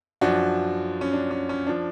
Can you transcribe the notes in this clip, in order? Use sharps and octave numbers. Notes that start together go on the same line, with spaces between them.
F#2 F3 D4 F#4
C#4
D4
C#4
C#4
F3 D4